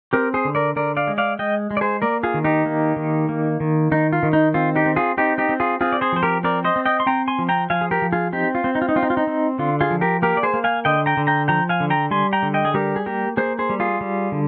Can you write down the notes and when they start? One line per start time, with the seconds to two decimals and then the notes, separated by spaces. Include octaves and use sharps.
0.13 C4 G4 A#4
0.34 G#4 C5
0.45 D3
0.55 A#4 D5
0.76 D3 A#4 D5
0.97 D5 F5
1.08 G#3
1.18 D5 F5
1.39 G#3 D#5 G5
1.71 G#3
1.77 D5
1.81 G#4 C5
2.02 A#3 A#4 D5
2.23 F4 G#4
2.34 D#3
2.44 D#4 G4
2.66 A#3
2.96 D#3
3.29 A#3
3.60 D#3
3.91 D#3 D#4
4.13 F4
4.23 D#3
4.33 D#4
4.54 C4 F4
4.76 D#4 G4
4.86 C4
4.96 F4 G#4
5.18 C4 D#4 G4
5.38 D#4 G4
5.49 C4
5.60 F4 G#4
5.81 C4 F4 G#4
5.92 D5
6.01 G#4 C5
6.12 F3 C5
6.23 G4 A#4
6.43 C4 A#4 D5
6.64 C5 D#5
6.76 C4
6.86 D#5 G5
7.00 C6
7.06 C4 G5 A#5
7.28 G#5 C6
7.39 F3
7.49 G5 A#5
7.70 F3 F5 G#5
7.81 G#4
7.91 G4 A#4
8.02 F3
8.13 F4 G#4
8.33 C4 D#4 G4
8.55 F4
8.64 C4
8.75 D#4
8.82 F4
8.89 D#4
8.96 C4 F4
9.03 D#4
9.10 F4
9.17 D#4
9.27 C4
9.59 D3 F4
9.81 F4 G#4
9.91 F3
10.01 G4 A#4
10.22 A#3 G4 A#4
10.37 D5
10.43 G#4 C5
10.54 A#3
10.64 F5 G#5
10.85 D3 D#5 G5
11.06 G5 A#5
11.17 D3
11.27 G5 A#5
11.48 F3 G5 A#5
11.69 F5 G#5
11.80 D3
11.90 G5 A#5
12.11 G3 G#5 C6
12.33 G5 A#5
12.43 D3
12.54 D#5 G5
12.65 G#4
12.74 G3 G4 A#4
12.96 G#4
13.06 A#3 G4 A#4
13.37 A#3 G#4 C5
13.59 G#4 C5
13.69 G3
13.80 F4 G#4
14.01 G3
14.32 D3